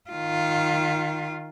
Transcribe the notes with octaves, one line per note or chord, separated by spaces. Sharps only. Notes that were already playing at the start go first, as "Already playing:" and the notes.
D#3 F4